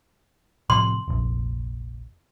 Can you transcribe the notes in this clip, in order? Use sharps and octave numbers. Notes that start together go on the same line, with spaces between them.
A2 C3 F3 C6
F1 A#1